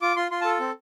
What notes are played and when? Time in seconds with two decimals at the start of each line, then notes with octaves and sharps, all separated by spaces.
0.02 F4 D6
0.17 F4 C6
0.31 F4 C6
0.41 A5
0.45 A4
0.60 C4